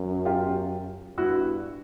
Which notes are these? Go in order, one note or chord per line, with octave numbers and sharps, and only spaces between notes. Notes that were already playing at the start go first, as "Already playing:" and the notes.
Already playing: F#2
F4 G4
G2 E4 F#4